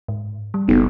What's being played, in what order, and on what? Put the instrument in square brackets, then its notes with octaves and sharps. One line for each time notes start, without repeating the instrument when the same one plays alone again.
[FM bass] G#2
G3
[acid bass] F#1 [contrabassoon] B1